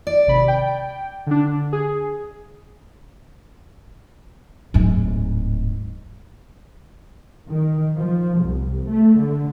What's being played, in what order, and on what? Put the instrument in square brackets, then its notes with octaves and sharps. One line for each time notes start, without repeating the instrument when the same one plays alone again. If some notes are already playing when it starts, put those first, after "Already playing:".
[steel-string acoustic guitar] D5
[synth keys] G#1 C3 B5
G5
D3 D4
G#4
[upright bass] D1 G#2
[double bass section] D#3
F3
C2
A3
D3